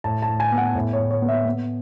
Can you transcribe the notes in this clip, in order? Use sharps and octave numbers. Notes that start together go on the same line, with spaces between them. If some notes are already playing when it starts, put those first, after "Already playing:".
A2 A5
A5
A2
G#5
B3
F#5
A2
C#5
A2
C#5
B3
E5
B3